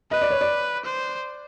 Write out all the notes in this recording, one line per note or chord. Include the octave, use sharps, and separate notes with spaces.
B4 D#5
D5
C#5
D5
C5